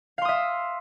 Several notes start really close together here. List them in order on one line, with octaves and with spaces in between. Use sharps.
F5 C6 D#6 E5